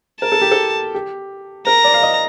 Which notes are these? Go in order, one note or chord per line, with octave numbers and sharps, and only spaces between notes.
A#4 A5
A4
G4
A4
G4
A#4 A#5
D5
F5
D#5